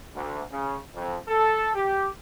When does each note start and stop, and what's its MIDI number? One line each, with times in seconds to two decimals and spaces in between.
0.15 0.43 38
0.50 0.77 49
0.94 1.16 41
1.28 1.70 69
1.75 2.09 67